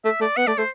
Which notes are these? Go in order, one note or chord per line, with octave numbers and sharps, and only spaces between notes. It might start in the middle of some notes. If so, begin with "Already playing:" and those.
A3 E5
A3 D5
B3 F#5
A3 D5
A3 C5